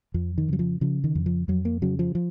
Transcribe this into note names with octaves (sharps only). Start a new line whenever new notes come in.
F2 F3
D#3
C#3 F#3
F3
C#3 F3
D#3
F2
F3
F2 F#3
A#3
C#3 F#3
F3
F3